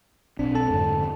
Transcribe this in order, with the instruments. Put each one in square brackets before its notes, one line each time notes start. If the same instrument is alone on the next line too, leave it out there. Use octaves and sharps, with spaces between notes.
[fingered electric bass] B1 C4 [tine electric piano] D4
[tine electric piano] A4 A5
[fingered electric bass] F2 G#2 D3